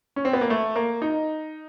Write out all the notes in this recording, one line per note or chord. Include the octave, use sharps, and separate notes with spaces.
C#4
C4
B3
A#3
A3
A#3
D#4